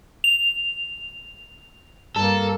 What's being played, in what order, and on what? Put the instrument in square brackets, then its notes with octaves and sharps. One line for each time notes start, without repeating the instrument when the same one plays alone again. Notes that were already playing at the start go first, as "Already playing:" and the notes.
[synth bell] F7
[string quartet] G2 A#3 [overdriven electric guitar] A4